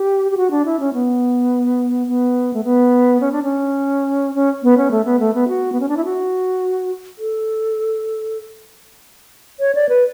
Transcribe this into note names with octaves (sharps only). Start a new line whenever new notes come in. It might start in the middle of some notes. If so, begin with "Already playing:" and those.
Already playing: G4
G4
F#4
D4
E4
C#4
B3
B3
A3
B3
C#4
D4
C#4
C#4
B3
C#4
A3
B3
A3
B3
F#4
B3
C#4
D4
E4
F#4
A4
C#5
D5
B4